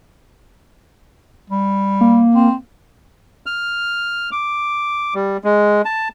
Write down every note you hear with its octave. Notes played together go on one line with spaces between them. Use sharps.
G3
A#3
C4
F6
D6
G3
G#3
A5